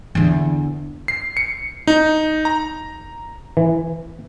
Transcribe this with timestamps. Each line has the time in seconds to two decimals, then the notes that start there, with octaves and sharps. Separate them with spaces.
0.15 E2 D3
1.08 C7
1.37 C#7
1.87 D#4
2.45 A#5
3.57 E3